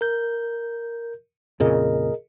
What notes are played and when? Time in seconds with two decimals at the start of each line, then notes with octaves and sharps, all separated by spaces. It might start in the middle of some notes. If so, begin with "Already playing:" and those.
0.01 A#4 G6
1.60 F2 A#2 C#3 G#4 A#4 D#5